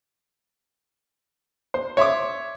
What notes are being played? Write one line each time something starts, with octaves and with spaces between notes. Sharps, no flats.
C5
C#5 E5 C6 D6